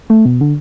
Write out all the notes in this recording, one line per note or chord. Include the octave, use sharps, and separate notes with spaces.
A3
B2
D3